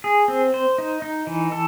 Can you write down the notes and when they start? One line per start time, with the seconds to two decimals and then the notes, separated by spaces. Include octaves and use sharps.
0.04 G#4
0.28 C4
0.54 C5
0.78 D#4
1.02 D#4
1.27 E3
1.52 A4